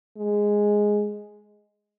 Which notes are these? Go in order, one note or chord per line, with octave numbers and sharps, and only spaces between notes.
G#3